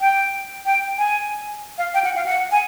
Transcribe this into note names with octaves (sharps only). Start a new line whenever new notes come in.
G5
G5
G#5
F5
G5
F#5
F5
F#5
G#5